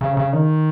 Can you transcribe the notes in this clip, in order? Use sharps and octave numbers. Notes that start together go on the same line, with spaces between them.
C#3
C#3
D#3